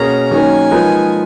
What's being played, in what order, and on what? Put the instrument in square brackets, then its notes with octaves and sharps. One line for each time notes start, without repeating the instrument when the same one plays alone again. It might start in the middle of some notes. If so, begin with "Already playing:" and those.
Already playing: [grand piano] B2 A#3 C#4 G#4 [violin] A#5
[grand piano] D#3 F#3 A#3 C#4 [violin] G#5
[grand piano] F3 G#3 B3 D#4 A#4